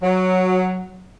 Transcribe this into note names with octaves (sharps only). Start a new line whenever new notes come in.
F#3